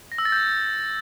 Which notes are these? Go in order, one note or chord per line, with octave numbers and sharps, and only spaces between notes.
A#6
E6
A6
G6